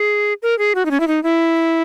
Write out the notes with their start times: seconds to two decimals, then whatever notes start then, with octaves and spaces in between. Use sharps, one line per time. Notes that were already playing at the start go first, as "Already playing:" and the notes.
Already playing: G#4
0.42 A#4
0.59 G#4
0.75 F#4
0.85 D#4
0.91 C#4
1.00 E4
1.07 D#4
1.23 E4